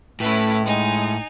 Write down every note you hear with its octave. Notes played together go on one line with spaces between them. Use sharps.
A2 A3 C#4 E4 B4
G#3 D#4 G#5